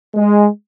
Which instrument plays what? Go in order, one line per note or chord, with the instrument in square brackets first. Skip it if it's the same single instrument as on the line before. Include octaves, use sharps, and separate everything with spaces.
[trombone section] G#3